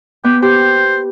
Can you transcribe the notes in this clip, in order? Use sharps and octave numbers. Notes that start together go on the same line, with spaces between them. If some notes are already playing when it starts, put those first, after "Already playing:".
B3 G4
G4 C5